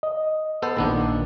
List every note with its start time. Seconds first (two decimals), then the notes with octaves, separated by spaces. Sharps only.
0.03 D#5
0.62 B3 A4 C5
0.77 A#1 A#2 D#3 B3 D4 B4